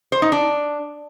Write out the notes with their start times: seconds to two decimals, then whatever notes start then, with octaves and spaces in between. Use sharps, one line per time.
0.12 C5
0.22 D#4
0.32 D4